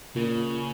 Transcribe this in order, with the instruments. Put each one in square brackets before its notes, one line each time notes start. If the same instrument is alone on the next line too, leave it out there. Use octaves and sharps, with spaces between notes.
[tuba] A#2 [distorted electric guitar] C#3